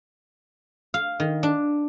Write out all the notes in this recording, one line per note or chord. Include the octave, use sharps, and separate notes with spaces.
F5
D#3
D4